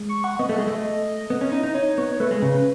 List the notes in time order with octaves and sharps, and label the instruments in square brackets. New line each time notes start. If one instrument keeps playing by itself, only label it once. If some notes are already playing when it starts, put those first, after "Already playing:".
Already playing: [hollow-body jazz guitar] G#3
[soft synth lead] C#6
F#5
[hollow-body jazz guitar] B3 [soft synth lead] D#5
[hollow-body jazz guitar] A3
G#3
A3
B3
C#4
D#4
D#4
[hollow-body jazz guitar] D#4 [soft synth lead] C#5
[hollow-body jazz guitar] B3 [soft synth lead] C#5
[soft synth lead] C#5
[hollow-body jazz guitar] A3 [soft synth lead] B4
[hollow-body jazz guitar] G#3
C#3